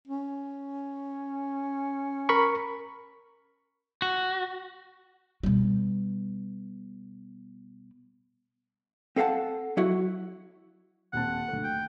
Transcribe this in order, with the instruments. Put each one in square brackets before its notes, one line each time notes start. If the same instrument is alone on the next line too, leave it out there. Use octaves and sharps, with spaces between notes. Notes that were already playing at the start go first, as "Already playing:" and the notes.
[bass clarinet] C#4
[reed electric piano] A#4 B5 C#6
[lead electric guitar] F#4
[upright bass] B2 G3
[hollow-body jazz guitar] C4 A4 F5 F#5 A5
F#3 E4 F#4
[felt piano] D#1 C4 A5 [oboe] F#5
[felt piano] D2 A3
[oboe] G5